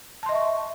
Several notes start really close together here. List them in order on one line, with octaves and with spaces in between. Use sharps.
A5 C6 D#5 E5 C#6